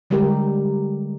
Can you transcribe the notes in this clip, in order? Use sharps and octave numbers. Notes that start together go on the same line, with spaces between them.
D3 G3 G#3 G4 A#4